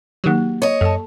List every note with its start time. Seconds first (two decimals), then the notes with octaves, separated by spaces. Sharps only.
0.24 D#3 F#3 A#3 G4
0.62 C#5 D#5
0.81 F#2 A4 A5